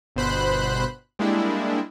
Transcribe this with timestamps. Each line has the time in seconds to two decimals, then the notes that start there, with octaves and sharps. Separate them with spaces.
0.16 G1 B2 C5 B5 F#6
1.19 G3 G#3 A#3 D4 E4